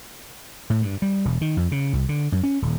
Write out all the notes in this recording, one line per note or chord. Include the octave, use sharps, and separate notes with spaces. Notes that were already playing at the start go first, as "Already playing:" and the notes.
A2
G2
G3
E1
D#3
F2
C#3
C2
D3
F#2
C#4
D#1